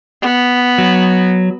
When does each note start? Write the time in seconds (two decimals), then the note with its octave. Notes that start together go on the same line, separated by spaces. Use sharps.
0.22 B3
0.78 F#3